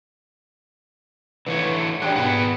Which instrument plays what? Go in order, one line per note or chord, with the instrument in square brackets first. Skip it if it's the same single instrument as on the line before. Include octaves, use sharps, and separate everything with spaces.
[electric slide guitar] D3 E3 C#5 [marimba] B4
[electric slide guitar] D4 G4 G#4 [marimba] D5 G5 F#6
[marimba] G#2 B2 [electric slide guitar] B3 G#4 F#5